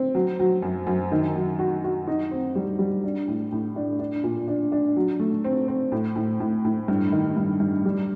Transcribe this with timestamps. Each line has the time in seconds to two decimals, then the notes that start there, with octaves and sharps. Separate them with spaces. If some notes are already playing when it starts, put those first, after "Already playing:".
Already playing: C4
0.15 F#3
0.40 F#3
0.62 F#2
0.87 F#2
1.12 D#3
1.35 F#3
1.59 F#4
1.84 F#4
2.07 D#4
2.31 C4
2.55 G3
2.79 G3
3.04 D4
3.28 A2
3.52 A2
3.76 D4
3.99 D4
4.23 A#2
4.48 D4
4.72 D4
4.97 F#3
5.20 A3
5.44 C4
5.68 C4
5.92 A2
6.16 A2
6.40 A2
6.65 A2
6.88 G2
7.12 D#3
7.37 G2
7.60 G2
7.85 G3